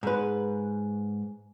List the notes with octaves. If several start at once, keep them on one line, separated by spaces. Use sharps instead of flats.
G#2 B4